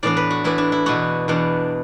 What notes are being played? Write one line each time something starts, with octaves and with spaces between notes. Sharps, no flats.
A2 E3 B3 D4 D5
B4
F#4
A2 E3 B3 D4 E4
D4
E4
E2 B2 B3 D4 F#4
E2 B2 B3 D4